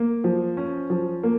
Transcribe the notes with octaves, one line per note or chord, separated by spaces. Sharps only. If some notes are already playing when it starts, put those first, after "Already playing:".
Already playing: A#3
F3
C#4
F3
A#3